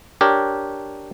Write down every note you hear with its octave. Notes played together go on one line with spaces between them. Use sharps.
D4 G4 A#4 C#5